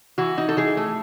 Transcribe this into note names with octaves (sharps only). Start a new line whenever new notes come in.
E3 F#4
D#4
A4
E3 G#4
A3